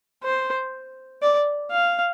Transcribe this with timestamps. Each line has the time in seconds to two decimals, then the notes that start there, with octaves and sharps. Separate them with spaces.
0.23 C5
1.22 D5
1.71 F5